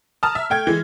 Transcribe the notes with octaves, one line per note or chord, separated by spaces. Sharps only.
A5 A#5 D#6 F6
E5
A3 G5 G#6
E3 G#3